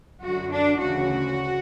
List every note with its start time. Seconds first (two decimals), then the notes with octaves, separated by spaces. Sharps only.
0.22 F#2 D3 F#4
0.50 D4
0.79 D2 C#3 E3 F#4